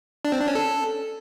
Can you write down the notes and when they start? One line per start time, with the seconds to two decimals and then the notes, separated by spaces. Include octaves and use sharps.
0.25 D4
0.32 C4
0.40 D4
0.48 C#4
0.55 A4